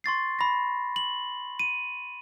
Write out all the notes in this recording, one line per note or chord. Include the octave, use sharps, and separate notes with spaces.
C6 C#6 A6 C7
B5 A#6
F#7
D#7